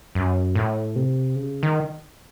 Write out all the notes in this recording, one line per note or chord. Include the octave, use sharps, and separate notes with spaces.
F#2
A2
C3
C#3
D#3